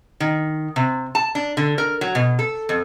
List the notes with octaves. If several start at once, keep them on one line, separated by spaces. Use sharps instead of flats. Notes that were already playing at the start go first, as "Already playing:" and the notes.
D#3
C3
A5
D4
D3
A#4
F#3
B2
A4
F2